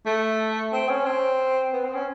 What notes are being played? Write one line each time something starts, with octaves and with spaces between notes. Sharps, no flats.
A3
C4
C#4
C4
B3
C4
C#4